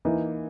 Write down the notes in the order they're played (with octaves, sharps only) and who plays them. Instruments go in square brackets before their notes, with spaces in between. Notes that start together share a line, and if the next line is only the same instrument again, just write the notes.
[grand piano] E3 A#3 D#4